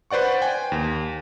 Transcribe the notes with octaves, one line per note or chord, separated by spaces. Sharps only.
B4 C5 D5 F#5 C#6
G5 G#5
D#2